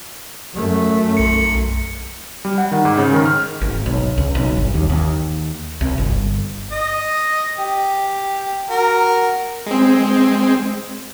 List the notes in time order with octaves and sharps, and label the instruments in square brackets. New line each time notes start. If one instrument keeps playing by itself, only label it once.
[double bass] F#2 A3
[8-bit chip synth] B1 C#7
[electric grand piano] G3
F#5
D#3
G#2
C#3
D#3
F6
[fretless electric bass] G#1
B1
C#2
B1
G1
D#2
D#2
C2
G1
[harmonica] D#5
G4
F#4 A#4
[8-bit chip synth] G#3 C4